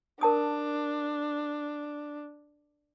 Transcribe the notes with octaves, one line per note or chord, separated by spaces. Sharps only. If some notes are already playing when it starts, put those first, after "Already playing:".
D4 A#4 A5 D#6